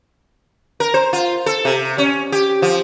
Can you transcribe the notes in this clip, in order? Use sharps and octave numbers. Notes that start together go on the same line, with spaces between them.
A#4
C5
F4
A4
C3
C#4
G4
F3